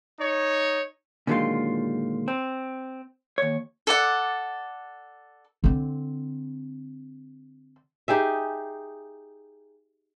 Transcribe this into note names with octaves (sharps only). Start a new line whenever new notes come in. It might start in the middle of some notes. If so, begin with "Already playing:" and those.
D#4 C#5
A#2 D3 D#3 F#3 G#3 F4
C4
D#2 C#5
A4 D5 F#5
D3 C4
D#4 G4 G#4 E5